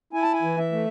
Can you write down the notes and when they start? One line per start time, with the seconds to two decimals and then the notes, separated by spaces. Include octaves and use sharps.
0.13 E4 G#5
0.22 A5
0.33 G#5
0.42 E3
0.58 E5
0.72 A3